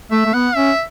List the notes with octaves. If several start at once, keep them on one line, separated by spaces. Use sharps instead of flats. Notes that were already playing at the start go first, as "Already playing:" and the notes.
A3 E5
A3
B3 F#5
C#4 E5